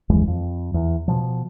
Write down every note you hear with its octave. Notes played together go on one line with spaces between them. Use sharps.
F#1 D#2 E3 G#3
F2
E2
B2 F3